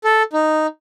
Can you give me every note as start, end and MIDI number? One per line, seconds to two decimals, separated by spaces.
0.04 0.23 69
0.33 0.67 63